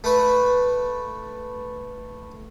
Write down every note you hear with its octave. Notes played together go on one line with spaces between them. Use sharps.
A3 B4